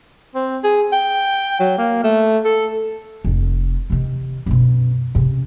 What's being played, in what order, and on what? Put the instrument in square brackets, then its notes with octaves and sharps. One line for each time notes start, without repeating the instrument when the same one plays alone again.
[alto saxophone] C4
G#4
G5
F#3
A#3
A3
A4
[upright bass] F1
C3 D#3
F#2 B2
C3 C#4